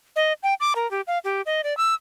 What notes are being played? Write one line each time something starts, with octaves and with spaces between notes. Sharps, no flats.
D#5
G5
D6
A#4
G4
F5
G4
D#5
D5
E6